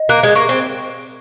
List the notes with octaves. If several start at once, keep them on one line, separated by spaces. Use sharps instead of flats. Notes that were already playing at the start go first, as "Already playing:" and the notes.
Already playing: D#5
A#3 F#6
G#3
A#3 C#6
C4